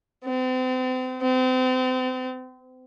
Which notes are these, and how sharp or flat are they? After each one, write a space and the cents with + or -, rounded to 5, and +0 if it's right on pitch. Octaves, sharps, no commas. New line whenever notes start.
C4 -40
C4 -35